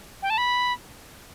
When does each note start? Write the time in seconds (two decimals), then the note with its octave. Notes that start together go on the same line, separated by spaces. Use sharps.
0.23 G5
0.30 A5
0.38 B5